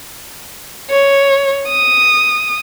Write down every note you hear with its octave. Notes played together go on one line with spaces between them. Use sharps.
C#5
D#6